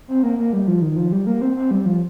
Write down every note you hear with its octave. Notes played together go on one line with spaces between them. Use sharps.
C4
A#3
A#3
G3
F3
D#3
F3
G3
A#3
C4
C4
G3
F3